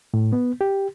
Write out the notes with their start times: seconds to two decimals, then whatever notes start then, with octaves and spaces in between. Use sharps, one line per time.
0.14 A2
0.33 B3
0.61 G4